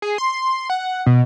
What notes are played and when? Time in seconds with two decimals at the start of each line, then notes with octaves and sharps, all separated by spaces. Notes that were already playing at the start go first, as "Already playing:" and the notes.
0.02 G#4
0.18 C6
0.70 F#5
1.06 B2